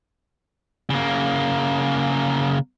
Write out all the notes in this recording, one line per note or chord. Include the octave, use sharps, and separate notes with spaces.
C#3 A#3